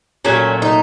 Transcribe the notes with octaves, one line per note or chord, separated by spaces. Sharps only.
A#2 F#3 A3 C#4
D#4